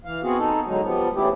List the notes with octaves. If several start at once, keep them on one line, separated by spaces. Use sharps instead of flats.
E3 F5
B3 C4 F#4 G#4
D#4 A4
D3 F#3 G#3 D#4
F3 G3 B3
C#3 E3 A3 D4 E4 G4